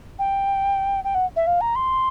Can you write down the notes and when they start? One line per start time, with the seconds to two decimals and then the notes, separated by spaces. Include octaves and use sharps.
0.19 G5
1.04 G5
1.15 F#5
1.36 E5
1.47 F5
1.61 A#5
1.76 C6